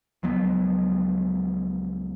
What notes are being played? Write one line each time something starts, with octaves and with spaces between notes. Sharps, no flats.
C#2 F3 F#3 B3